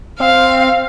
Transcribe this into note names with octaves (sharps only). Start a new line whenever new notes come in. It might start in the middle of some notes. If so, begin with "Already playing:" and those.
C4 F5